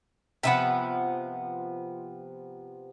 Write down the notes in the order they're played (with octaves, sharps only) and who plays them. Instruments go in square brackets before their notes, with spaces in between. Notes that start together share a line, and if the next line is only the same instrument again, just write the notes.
[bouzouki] C3 F3 B3 [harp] E5 F#5